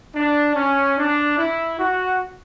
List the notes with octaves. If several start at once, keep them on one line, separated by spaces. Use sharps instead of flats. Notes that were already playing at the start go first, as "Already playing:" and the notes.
D4
C#4
D4
E4
F#4